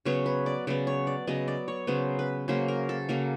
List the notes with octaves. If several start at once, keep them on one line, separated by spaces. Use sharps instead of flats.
C#3 F#3 B3 C#5
B4
D5
C#3 F#3 B3 D5
C#5
D5
C#3 F#3 B3 D#5
D5
C#5
C#3 F#3 B3 C5
B4
C#3 F#3 A#3 C5
A#4
A4
C#3 F#3 A#3